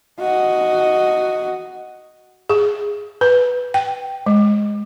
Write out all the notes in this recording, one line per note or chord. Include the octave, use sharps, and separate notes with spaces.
F#4 D#5
G#4
B4
G5
G#3